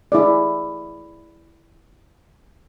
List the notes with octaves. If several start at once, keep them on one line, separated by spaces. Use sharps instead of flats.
E4 G#4 D5